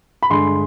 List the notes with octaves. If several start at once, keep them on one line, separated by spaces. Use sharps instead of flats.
B5
G2 D3 G#3 C6